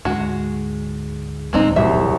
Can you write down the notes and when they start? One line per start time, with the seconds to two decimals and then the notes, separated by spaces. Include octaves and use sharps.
0.05 D2 G#2 G#3 F#4
1.53 E1 D#2 A#2 G#3 C4 D#4
1.76 D1 C2 E5